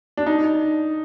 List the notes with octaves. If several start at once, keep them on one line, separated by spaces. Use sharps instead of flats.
D4
D#4